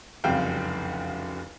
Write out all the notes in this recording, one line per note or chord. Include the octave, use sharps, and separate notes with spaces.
F1 C2 F#2 C#3 F5 G5